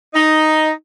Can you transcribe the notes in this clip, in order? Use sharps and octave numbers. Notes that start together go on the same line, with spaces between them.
D#4